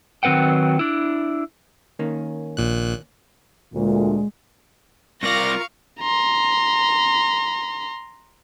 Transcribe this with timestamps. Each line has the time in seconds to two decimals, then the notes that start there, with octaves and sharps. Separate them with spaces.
0.23 D#3 F#3 C4 B4 F#5 G5
0.79 D4 E4
1.99 D#3 A#3 C#4
2.57 A#1 A#2 F#6
3.74 D2 A#2 G#3
5.23 C2 F4 A#4 D5 F5 C#6 A#6
6.01 A#5 C6